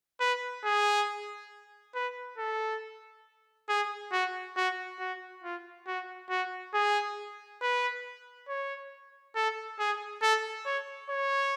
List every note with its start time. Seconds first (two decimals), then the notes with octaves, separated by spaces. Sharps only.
0.20 B4
0.64 G#4
1.95 B4
2.38 A4
3.69 G#4
4.12 F#4
4.56 F#4
5.00 F#4
5.44 F4
5.87 F#4
6.30 F#4
6.74 G#4
7.61 B4
8.48 C#5
9.35 A4
9.79 G#4
10.22 A4
10.66 C#5
11.10 C#5